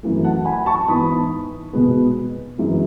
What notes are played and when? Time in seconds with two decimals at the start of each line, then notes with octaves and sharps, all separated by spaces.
0.03 F#2 E3 A3
0.24 F#5 A5
0.45 G#5 B5
0.66 A5 C#6
0.88 G#2 E3 B3 B5 D#6
1.73 B2 G#3 B3
2.58 F#2 E3 G#3